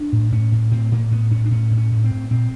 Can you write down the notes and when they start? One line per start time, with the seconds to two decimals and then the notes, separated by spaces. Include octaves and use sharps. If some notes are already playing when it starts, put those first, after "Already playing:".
Already playing: D4
0.12 A2
0.32 A2 C#4
0.52 A2
0.71 A2 C4
0.92 A2 A#3
1.11 A2 B3
1.31 A2 C#4
1.46 D4
1.51 A2 C#4
1.71 A2
1.77 C#4
1.91 A2
2.04 C4
2.10 A2
2.30 A#2 C4